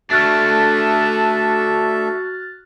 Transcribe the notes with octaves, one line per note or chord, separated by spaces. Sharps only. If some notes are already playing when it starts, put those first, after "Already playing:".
A3 D4 F#4 A4 E5 F6 F#6 A6